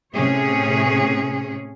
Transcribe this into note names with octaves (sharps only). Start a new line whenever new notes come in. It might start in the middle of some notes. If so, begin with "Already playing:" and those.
A2 C3 C#4 G#4 C#5